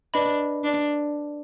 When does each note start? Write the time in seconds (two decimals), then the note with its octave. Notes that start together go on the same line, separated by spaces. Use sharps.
0.14 D4 B4 D#5 B5
0.64 D4